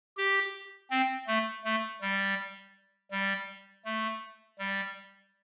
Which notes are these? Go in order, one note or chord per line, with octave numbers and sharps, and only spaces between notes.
G4
C4
A3
A3
G3
G3
A3
G3